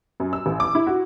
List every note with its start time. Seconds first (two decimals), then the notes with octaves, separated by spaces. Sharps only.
0.20 F#2
0.33 E6
0.46 A1
0.60 D6
0.75 E4
0.87 F#4